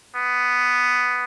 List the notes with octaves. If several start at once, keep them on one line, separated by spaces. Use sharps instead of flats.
B3